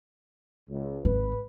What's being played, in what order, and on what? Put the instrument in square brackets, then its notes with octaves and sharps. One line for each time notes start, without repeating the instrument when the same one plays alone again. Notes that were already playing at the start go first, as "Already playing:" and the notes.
[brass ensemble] C#2
[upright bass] G#1 [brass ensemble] B4